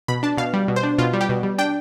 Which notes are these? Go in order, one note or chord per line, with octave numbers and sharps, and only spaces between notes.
B2 B5
D4 A5
B2 F5
G3
B2
C5
D4
B2 F4
G3
G4
B2
G3
D4 G5